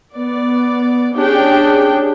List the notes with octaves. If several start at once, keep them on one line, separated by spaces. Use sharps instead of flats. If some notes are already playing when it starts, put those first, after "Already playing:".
B3 D5
C#4 D4 G4 G#4 G5